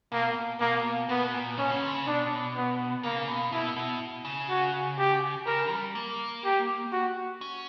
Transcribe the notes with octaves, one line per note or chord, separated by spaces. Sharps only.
B2 A#3
B2 A#3
B2 B3
A#2
B2 C#4
C#3
D3
C#3
B2 D4
B3
C#3 A#3
B2
B2 E4
B2
C#3
F#4
G4
C#3 A#4
G3
A#3
G4
F#4
C#4